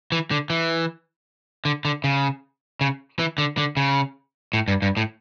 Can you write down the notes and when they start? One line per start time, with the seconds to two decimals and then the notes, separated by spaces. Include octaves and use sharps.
0.12 E3
0.31 D3
0.50 E3
1.65 D3
1.85 D3
2.04 C#3
2.81 C#3
3.19 E3
3.38 D3
3.58 D3
3.77 C#3
4.53 A2
4.68 G2
4.82 G2
4.97 A2